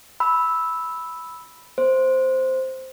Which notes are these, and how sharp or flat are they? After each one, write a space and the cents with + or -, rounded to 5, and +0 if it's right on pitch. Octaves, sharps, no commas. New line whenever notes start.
B5 +0 E6 -10
B3 +0 C5 +0